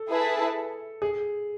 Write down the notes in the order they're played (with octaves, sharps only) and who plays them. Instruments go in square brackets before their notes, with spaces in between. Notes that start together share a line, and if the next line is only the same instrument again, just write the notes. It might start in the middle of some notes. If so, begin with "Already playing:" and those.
Already playing: [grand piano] A4
[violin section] E4 G#4 B4 E5 A5
[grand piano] G#4